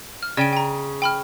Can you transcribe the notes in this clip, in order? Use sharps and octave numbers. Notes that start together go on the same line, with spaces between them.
F6
C#3 D5 G5 D7
G5 A#5
G5 B5 F6